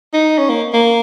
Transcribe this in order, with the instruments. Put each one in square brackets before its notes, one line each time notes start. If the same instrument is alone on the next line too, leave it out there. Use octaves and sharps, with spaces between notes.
[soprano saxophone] D#4
C#4
A#3
A#3